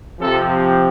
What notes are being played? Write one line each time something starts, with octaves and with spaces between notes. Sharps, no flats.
C3 F3 A4